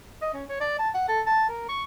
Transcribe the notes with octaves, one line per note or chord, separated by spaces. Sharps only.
D#5
C#4
C#5
D5
A5
F#5
A4
A5
A#4
C#6